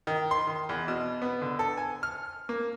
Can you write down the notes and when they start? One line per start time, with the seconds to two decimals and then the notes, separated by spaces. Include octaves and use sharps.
0.07 D#3
0.31 C6
0.47 D#3
0.69 E2
0.88 B2
1.22 B3
1.42 D3
1.59 A4
1.77 G#5
2.03 F6
2.49 A#3